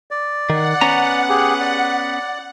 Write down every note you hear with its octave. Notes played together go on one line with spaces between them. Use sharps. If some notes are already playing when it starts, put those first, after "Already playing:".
D5
D#3 F#5
B3 C#4 A#5
G4 G#4
D5